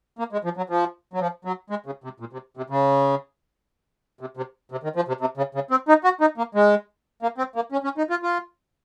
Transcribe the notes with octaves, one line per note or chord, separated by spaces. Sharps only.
A#3
G#3
F3
F#3
F3
F#3
F3
F#3
G#3
C#3
C3
A#2
C3
C3
C#3
C3
C3
C3
D#3
F3
C3
C3
C#3
C#3
C4
D#4
F#4
D#4
A#3
G#3
A#3
C4
A#3
C#4
C#4
D#4
F4
F4